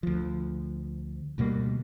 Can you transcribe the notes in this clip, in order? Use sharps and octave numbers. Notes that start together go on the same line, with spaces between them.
D2 F3
D2 B2 G3 A#3